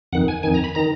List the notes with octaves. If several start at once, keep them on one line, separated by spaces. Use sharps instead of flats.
F2 D#3 F#5
G#5
F2 D#3 G#5
A#5
B5
D#3 A#5